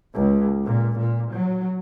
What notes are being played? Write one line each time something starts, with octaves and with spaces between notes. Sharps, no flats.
C#2
A#2
A#2
F#3